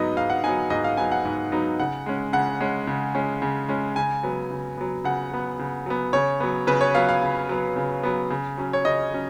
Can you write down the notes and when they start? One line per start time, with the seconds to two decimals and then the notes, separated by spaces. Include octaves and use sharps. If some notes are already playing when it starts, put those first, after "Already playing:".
Already playing: G#2 F#3 B3 D#4 D#5
0.17 G#2 F5
0.30 F#5
0.44 F#3 B3 D#4 G#5
0.70 G#2 D#5
0.84 F5
0.97 F#3 B3 D#4 G#5
1.12 F#5
1.25 G#2
1.52 F#3 B3 D#4
1.80 C#3 F#5
2.06 G#3 C#4
2.33 C#3 F#5
2.60 G#3 C#4
2.87 C#3
3.15 G#3 C#4
3.42 C#3
3.69 G#3 C#4
3.96 C#3 G#5
4.23 F#3 B3
4.51 C#3
4.78 F#3 B3
5.04 C#3 F#5
5.32 F#3 B3
5.59 C#3
5.86 F#3 B3
6.13 C#3 C#5
6.40 F#3 B3
6.67 C#3 B4
6.81 C#5
6.95 F#3 B3 F5
7.09 F5
7.22 C#3
7.49 F#3 B3
7.76 C#3
8.03 F#3 B3
8.30 C#3
8.58 F#3 C#4
8.73 C#5
8.85 C#3 D#5
9.12 F#3 C#4